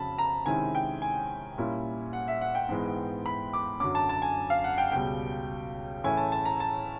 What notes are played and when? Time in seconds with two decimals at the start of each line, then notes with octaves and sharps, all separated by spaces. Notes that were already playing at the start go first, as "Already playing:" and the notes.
Already playing: F2 C#3 F#3 A5 B5
0.18 A#5
0.46 C3 D#3 G#3 C#4 E4 G#5
0.75 G5
1.02 G#5
1.58 A#2 G3 A#3 C#4 E4
2.13 F#5
2.28 E5
2.41 F#5
2.55 G5
2.69 G#2 E3 G#3 B3
3.26 B5
3.53 D6
3.80 F#2 D3 F#3 D6
3.95 A5
4.09 A5
4.22 G#5
4.50 F5
4.64 F#5
4.78 G5
4.92 C#2 B2 G3 G5
6.04 A2 E3 A3 C#4 E4 G#5
6.17 A5
6.32 A5
6.45 A#5
6.60 A5